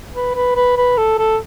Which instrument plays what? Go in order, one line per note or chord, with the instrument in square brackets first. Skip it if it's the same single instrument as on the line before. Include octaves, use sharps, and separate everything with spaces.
[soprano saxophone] B4
B4
B4
B4
A4
A4